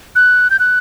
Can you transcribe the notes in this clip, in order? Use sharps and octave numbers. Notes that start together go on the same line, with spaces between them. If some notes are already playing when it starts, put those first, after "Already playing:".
F#6
G6
F#6